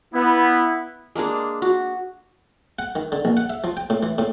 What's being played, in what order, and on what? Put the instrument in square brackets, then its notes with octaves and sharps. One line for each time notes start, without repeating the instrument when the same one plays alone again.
[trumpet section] B3 [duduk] E4
[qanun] G#3 A#3 D4 G#4
F#4
[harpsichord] F#5
D#3
D3
A#1
F#5
E5
F3
G5
A2
E3
A2